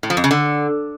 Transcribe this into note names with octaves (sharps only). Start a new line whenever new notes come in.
A2
F3
F2
C#3
D3